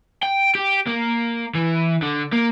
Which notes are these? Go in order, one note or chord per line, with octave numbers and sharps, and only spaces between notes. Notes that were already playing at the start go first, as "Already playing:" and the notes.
G5
G4
A#3
E3
D3
A#3